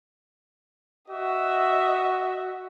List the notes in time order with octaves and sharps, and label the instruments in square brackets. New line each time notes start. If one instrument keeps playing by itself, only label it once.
[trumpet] F#4 [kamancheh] D#5 E5